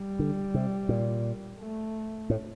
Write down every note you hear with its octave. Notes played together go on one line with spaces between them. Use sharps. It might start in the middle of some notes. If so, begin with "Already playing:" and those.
Already playing: G3
D3
C3
A#2
A3
A2